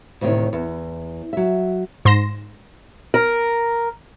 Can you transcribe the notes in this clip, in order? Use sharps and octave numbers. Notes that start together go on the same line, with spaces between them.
D2 A2 C3 D#3 C#5
E2
F#3 E5
G#2 C6 A#6 E7
A#4